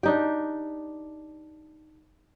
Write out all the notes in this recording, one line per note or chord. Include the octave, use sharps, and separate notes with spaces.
D4 D#4 G4